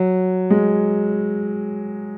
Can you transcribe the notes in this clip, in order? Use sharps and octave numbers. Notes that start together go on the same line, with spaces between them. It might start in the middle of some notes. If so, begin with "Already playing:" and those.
Already playing: F#3
G#3